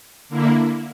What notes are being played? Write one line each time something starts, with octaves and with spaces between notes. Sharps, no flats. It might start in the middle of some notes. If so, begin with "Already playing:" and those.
D3 A#3 E4